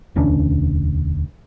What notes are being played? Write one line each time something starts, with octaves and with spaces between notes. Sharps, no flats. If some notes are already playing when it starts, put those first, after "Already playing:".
E1 D2 C#4 D4